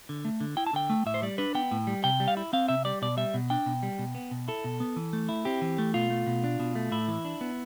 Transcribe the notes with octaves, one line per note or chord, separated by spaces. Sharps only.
D3
A3
D3
E4 G5
A5
D3 G5
A3
A2 E5
C5
G3 D5
D4 B4
B3 G5
A2
G3
C3 G5
G3
F5
E4
C4 F5
C3 E5
G3 D5
B2 D5
G3 E5
B2
D4 G5
B2
G3
B2
B3
B2
E4 A4
B2
B3
E3
A3
E4
C4 G4
E3
A3
B2 F4
A3
B2
D4
B2
A3
A2 E4
E3
D4
B3